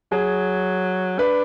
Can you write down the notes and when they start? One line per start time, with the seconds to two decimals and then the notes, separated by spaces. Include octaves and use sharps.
0.12 F#3 G#4
1.19 D4 B4